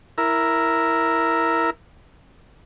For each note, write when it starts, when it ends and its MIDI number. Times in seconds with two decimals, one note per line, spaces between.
0.18 1.70 64
0.18 1.70 70